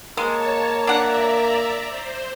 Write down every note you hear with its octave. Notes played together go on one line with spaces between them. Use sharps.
G#3 A#3 C#5 A5
D4 D5 E5 F#5 A#5
C5